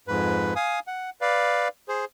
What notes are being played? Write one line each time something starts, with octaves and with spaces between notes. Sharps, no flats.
F2 G#2 B4
F5 G#5 D#6
F#5
B4 D5 F5
G#4 C5